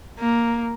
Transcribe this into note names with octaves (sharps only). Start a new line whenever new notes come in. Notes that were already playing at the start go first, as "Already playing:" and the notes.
A#3